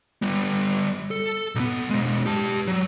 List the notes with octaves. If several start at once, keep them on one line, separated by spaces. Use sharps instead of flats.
G3 B3
A4
B1 B3
B2 G#3
G4 A5
F#3